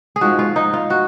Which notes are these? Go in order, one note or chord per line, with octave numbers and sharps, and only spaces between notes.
G#4
G#2 F3 G#3 F#4
F4
D#4
F4
F#4